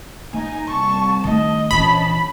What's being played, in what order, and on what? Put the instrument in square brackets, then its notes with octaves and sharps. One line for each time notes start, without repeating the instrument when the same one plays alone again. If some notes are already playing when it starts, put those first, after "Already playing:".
[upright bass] A#3 [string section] D#4 G#5
[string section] C2 A5 [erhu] C#6
[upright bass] D#3 A3 [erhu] D#5
[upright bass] A#1 E3 [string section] C#4 A5 [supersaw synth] B5